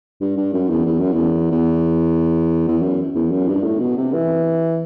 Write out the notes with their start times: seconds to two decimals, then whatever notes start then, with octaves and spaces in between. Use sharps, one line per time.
0.21 G2
0.37 G2
0.53 F#2
0.70 E2
0.86 E2
1.00 F#2
1.13 E2
1.51 E2
2.68 E2
2.82 F#2
3.15 E2
3.31 F#2
3.48 G2
3.64 A2
3.80 B2
3.97 C3
4.13 E3